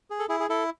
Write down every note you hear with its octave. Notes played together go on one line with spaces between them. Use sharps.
G#4
A4
E4 G#4
G#4
E4 A4